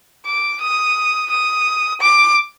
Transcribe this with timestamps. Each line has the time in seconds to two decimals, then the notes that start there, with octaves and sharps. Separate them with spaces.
0.26 D6
0.61 D#6
1.30 D#6
2.01 D6